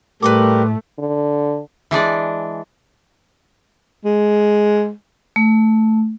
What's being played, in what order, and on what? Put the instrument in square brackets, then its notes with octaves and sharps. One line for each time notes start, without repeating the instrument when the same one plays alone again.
[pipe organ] A2 [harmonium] G3 G4 A#4 [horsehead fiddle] A3 [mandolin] B4 C6 D6
[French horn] D3
[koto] E3 G#3 D4 D5
[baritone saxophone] G#3
[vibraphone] A3